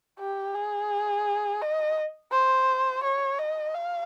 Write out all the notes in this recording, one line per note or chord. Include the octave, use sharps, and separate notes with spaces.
G4
G#4
D#5
C5
C#5
D#5
F5